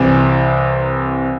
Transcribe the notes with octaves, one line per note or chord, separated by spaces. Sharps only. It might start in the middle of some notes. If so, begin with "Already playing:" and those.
Already playing: C2 C3 E3 C4